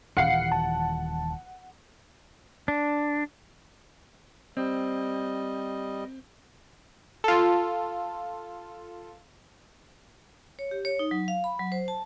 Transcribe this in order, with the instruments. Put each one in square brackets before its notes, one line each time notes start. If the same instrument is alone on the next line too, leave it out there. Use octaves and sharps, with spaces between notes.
[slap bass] D#1 E3 [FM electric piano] F5 C7 C#7 [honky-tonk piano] F#5
[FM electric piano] A5
[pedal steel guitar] D4
[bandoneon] G3 D#5 [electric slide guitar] C4
[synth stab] F4 A4
[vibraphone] C#5
G4
C#5
D#4
F#3
F5
B5
F#3
C5
A5